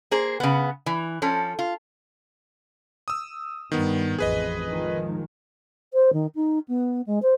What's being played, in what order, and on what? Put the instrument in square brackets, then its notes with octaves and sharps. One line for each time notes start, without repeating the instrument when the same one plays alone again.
[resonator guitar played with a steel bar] A#3 G#4 C5
C#3 B3
E3
F3 C#4 A4
F4
[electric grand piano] D#6 E6
[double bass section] G2 [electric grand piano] D#3 B3
[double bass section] A1 F2 [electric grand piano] G#4 B4 D#5
[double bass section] D#3 F3 G#3
[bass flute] C5
D#3
D#4
B3
G#3
C5